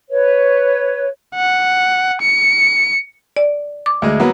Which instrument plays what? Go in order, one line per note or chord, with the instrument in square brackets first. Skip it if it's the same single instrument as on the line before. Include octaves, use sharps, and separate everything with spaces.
[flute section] B4 C#5
[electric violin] F#5
C#7
[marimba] D5
D6
[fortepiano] D2 G#3
F#3 A#3 B3